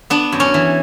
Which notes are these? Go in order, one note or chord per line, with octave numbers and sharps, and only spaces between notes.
B3 D4
F#2
C#4
E3